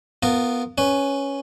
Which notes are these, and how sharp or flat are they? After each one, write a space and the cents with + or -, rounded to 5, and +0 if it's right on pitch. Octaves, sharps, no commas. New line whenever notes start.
B3 +0 F4 +0 A#4 -20
C#4 +0 B4 +0